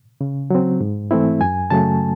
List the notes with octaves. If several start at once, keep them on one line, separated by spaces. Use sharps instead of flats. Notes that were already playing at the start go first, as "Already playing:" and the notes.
C#3
F#3 C4
G#2
E3 A3 C4 E4
F#2 G#5
C#3 F#3 A3 A5